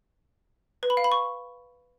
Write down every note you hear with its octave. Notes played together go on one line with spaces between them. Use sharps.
B4
B5
F5
B5
C#6